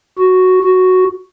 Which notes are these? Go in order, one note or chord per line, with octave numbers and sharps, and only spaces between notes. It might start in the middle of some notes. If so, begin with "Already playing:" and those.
F#4
F#4